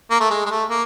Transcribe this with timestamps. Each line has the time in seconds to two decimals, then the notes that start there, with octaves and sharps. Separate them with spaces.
0.11 A#3
0.20 A3
0.30 G#3
0.46 G#3
0.50 A3
0.70 A#3